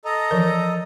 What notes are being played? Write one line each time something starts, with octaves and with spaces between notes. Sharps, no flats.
A4 D#5 A#5
E3 F3 A#4